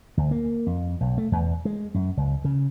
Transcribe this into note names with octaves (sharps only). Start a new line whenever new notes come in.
D2
A#3
F2
B1
A3
E2
G#3
F#2
C#2
C#3